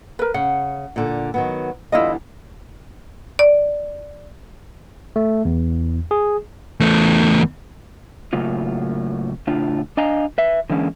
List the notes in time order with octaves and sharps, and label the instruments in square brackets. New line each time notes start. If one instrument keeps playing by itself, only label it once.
[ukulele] A#4 B4
[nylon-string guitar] C#3 [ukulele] F#5
[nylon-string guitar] A#2 D3
D#3 F#3 B3
[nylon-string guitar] E2 D3 G3 [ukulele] E4 F4 D#5
[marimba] D5
[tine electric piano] A3
E2
G#4
[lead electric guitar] E2 A3
[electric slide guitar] A2 C#3 F#3 A#3 F4
A2 C#3 D4 F4
D4 D#5 F5 G#5 A#5
B4 E5
D3 E3 G#3 A#3 B3 C#4